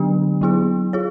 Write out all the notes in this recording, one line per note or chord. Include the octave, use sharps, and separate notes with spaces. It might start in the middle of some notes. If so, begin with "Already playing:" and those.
Already playing: D3 F#3 B3 D4 G4
F#3 B3 E4 G#4
F4 G#4 C#5